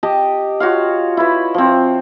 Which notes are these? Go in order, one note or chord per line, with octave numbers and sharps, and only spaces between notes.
G4 D#5 A5
F4 F#4 C#5 F5
E4 B4
F3 C4